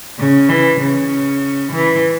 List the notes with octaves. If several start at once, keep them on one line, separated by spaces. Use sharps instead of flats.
C#3
E3
C#3
E3